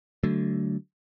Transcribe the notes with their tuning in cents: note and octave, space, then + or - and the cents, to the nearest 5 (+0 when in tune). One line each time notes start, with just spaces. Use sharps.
D3 +0 F#3 +25 A3 +0